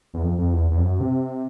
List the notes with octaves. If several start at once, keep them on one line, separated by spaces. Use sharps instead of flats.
E2
F2
F2
E2
E2
F2
F#2
C3